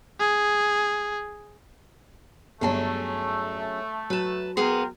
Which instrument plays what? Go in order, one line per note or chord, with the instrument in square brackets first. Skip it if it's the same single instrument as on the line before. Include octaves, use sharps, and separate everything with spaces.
[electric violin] G#4
[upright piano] G1 A5 [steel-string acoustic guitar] F#3 C#4 G#4 [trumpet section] A3
[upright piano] F#3 [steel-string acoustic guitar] B4 A5
[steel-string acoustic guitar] A#3 B3 G#4 [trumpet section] A#4 G5 C6